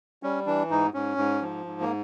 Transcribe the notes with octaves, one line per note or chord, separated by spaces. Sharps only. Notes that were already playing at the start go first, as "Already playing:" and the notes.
G3 C#4
E3 D4
G#2 D#4
G#2 C#4
G#2
F3
G#2
A#3